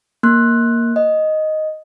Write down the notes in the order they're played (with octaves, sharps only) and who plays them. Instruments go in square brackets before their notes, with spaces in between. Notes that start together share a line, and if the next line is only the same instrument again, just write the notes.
[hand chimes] A#3 F#6
D#5